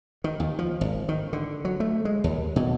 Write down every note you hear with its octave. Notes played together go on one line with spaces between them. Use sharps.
D#3
D#2
F3
G#1
D#3
D3
F#3
A3
G#3
D#2
B2